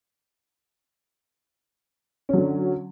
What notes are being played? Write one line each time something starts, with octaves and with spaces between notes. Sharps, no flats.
D3 F#3 C#4